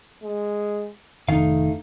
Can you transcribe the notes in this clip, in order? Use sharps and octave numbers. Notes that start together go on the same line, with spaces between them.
G#3
F1 D#3 A3 D#4 F5